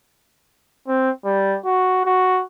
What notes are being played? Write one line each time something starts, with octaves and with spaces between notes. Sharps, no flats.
C4
G3
F#4
F#4